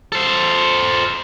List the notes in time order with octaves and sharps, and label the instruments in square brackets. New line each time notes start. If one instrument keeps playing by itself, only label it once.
[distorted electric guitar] A4 C5